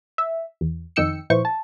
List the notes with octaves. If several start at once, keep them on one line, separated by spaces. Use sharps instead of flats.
E5
E2
F2 D#3 D#4 G5 E6 C#7
A#2 F3 E4 B4 C5 C#6
A5